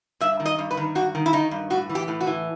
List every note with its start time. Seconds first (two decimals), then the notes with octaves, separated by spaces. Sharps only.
0.21 G2 E5
0.40 D#3
0.46 D#5
0.58 G2
0.71 B4
0.77 D#3
0.95 G2 F#4
1.15 D#3
1.26 E4
1.33 D#3 D#4
1.51 G2
1.70 A2 F#4
1.89 E3
1.95 G4
2.08 A2
2.21 F#4
2.27 E3